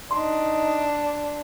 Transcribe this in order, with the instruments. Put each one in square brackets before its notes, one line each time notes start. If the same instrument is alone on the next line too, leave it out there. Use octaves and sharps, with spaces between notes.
[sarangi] D4 [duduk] D#4 [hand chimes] C6